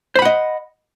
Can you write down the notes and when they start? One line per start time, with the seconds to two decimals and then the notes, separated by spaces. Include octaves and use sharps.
0.16 C5
0.19 B5
0.22 F#5
0.25 D#5